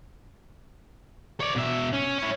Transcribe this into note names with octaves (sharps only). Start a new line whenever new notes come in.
C#5 D5
B2 E5
C#4
E4 C#5